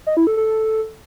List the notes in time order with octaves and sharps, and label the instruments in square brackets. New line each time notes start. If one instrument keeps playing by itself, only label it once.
[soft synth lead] D#5
E4
A4
A4